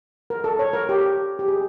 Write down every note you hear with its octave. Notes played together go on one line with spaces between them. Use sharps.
A#4
A4
C#5
A#4
G4
G4
G#4